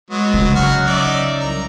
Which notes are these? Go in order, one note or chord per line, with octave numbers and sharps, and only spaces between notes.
F#3 G#3 B3
C#3
F#3 F#4 F6
D#4 D5 E5
C2 A#5